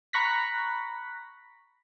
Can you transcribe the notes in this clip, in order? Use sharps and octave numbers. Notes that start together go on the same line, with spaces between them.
A#5 B5 C#6 F#6 A#6 B6